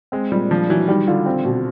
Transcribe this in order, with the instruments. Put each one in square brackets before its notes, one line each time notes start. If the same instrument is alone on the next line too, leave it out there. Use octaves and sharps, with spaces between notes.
[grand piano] G#3 [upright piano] C4
[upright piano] A#2 [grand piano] G3
[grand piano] F3 [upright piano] D4
[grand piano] E3 [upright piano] F#3
[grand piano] D#3 [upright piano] G3
[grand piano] D3 [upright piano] F4
[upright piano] C4
B2